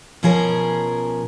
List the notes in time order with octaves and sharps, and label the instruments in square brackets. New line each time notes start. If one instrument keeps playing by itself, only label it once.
[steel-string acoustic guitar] B2 F3 C#4 G#4 A#4